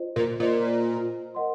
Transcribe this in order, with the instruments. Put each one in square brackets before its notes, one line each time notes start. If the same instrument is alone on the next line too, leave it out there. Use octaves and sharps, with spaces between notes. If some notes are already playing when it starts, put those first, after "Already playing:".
Already playing: [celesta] F4 C5 D#5
[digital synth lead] A#2
[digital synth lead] A#2 [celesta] F4 C5 D#5
[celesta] A#4 D#5 F#5 C6